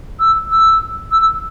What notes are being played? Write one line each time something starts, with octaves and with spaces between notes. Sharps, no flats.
E6
E6
E6